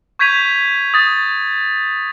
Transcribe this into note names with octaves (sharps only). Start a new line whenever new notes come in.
C#6 G6 G#6 B6 D#7 F7
D#6 A6